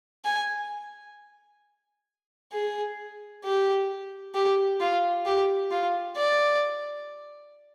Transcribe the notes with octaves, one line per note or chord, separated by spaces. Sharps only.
G#5
G#4
G4
G4
F4
G4
F4
D5